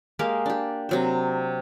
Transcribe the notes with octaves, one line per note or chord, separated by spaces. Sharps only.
G#3 A#3 G4 F5
D4 G4
C3 F#3 C5